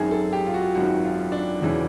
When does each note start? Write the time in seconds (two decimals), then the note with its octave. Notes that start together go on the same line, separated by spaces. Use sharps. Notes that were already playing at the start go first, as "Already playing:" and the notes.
Already playing: G#1 F#2 D#3 G#4
0.11 A4
0.33 G4
0.47 F4
0.54 F#4
0.75 G#1 F#2 D#3 F#4
1.03 F4
1.32 D4
1.60 E1 E2 C#3 E3